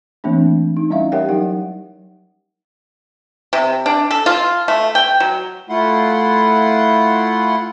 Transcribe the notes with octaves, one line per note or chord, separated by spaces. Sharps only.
E3 A3 A#3 C4 D4
D#4
G3 C#4 E4 E5 F5
G4 A#4 C#5 E5 F#5 G5
F#3 D#4 F#5
C3
D4
A4
F4
A3
G5
F#3
A3 E4 F4 F#5 C6